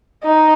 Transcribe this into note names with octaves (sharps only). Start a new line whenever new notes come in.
D#4